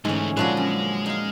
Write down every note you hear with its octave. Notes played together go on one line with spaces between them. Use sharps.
D2 G#2 E3 A3 C#4
A#2 D3 F3 F#3 G#3 F#4 B4
F#2
G#3 D#4 F5